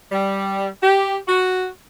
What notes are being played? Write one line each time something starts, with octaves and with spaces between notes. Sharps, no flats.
G3
G4
F#4